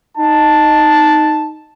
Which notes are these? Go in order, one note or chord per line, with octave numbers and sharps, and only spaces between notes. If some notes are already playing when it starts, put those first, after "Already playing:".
D#4 A5